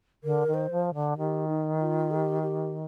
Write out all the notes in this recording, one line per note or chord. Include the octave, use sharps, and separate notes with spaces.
D3 A#4
D#3
C5
F3
D3
D#3 G4
D#4
F4
A4
G4
G4